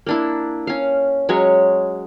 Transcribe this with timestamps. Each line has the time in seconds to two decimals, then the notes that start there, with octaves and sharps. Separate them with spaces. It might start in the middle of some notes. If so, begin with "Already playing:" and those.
0.07 A#3 D4 E4
0.67 C#4 F5
1.29 F#3 G#3 C#4 C#5